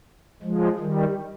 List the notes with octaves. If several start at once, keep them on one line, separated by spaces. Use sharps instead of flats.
F3 G#3
D#3 G3